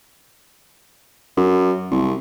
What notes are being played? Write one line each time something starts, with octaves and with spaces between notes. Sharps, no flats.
F#2
C2